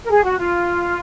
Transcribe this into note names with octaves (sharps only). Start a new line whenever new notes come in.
A#4
G#4
F#4
F4